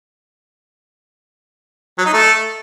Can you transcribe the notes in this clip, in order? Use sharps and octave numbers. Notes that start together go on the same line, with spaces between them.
F#3
D#4
A3